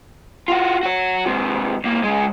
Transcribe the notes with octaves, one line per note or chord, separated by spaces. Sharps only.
F4 F#4
F#4 C#5
G#2 C3
C#2 A#3
C#3 G#3